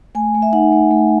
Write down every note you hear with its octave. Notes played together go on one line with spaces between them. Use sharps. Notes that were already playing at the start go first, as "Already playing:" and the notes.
A3 G#5
A3
E5
D#4 F#5
A3
A3